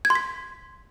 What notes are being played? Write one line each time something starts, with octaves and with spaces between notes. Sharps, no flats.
G#6
C6
B6